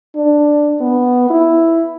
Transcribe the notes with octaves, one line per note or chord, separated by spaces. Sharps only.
D4
B3
E4